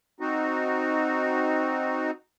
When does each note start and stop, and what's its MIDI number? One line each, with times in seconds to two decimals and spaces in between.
0.20 2.11 60
0.20 2.11 63
0.20 2.11 66